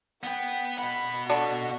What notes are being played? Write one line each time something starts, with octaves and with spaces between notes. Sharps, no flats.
B3 B4 F#5 G5
B2 F#5 B5
D3 F#4